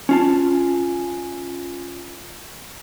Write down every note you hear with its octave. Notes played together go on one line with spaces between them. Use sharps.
C#4 F4 A5